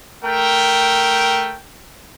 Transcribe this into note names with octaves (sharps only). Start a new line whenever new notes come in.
A3 A#4 G5